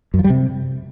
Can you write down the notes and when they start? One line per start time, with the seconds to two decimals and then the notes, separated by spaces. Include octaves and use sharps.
0.14 F#2
0.19 F3
0.24 G3
0.30 C3